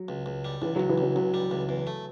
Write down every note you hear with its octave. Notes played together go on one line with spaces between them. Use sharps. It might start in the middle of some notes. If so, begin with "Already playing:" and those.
Already playing: F#3
C#2
C#2
G3
C#2 E3
C#2 F#3
E3
C#2 F#3
C#2 F#3
G3
C#2
E2
A3